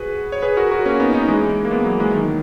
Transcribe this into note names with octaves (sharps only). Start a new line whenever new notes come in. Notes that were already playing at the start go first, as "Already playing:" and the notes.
Already playing: F#4 G#4 B4
C#5
G#4 B4
F#4 A#4
F#4 A#4
A#3 C#4
B3 D#4
B3 D#4
E3 G#3
A#3
G#3 B3
F#3 A#3
E3 G#3
D#3 F#3